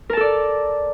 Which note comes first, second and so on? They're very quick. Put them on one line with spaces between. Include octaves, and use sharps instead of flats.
A#4 A5 A4 D5